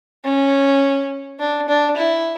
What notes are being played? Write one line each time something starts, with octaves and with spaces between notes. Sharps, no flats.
C#4
D4
D4
E4